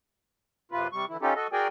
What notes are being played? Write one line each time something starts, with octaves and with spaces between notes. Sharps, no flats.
F#2 C3 F4 B4
C3 G3 C#6
D3 E3 E4
C#4 D#4 F4 G4 A4
F#4 A4 D#5
F#4 G#4 A#4 D5 G5 G#5